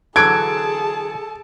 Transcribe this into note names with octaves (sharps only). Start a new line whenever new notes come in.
D3 E3 F#3 G#4 A4 A5 G#6 D7